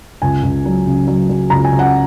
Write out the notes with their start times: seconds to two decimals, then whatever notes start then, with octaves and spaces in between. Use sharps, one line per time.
0.22 C#2 G#5
0.43 C#2
0.65 F#3
0.86 C#3
1.07 F#3
1.29 F#3
1.50 C#2 A#5
1.65 G#5
1.73 C#3
1.79 F#5